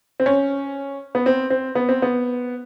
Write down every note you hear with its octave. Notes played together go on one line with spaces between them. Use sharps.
C4
C#4
B3
C4
C4
B3
C4
B3